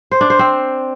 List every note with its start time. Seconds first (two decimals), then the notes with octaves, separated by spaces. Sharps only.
0.11 C5
0.21 D4
0.30 C5
0.39 C4